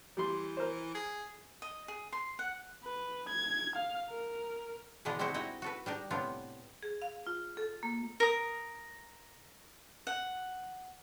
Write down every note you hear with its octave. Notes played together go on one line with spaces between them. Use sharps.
E3 G3 C6
A#4 C5
G#4
D#5
G#4
C6
F#5
B4
G#6
F5
A#4
B2 D3 E3 D4 F4 D#5
G3 G#3 C4 E4 F#4 C5
D#4 E4 F#4 D#5 E5
F#4 A4 B4
G3 D4 D#4
A2 C3 B3 C4 D4 F4
G#4
F5
F4
A4
A#3
A#4 D#6
F#5